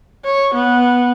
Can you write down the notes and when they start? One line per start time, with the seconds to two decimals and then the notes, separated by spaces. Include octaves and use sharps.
0.25 C#5
0.54 B3